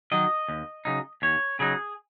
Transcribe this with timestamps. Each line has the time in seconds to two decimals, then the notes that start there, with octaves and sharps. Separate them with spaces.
0.12 D#3 F#3 D#5
0.48 D#2
0.85 C#3 F#3 D#4
1.22 D#2 C#5
1.59 C#3 F#3 D#4 G#4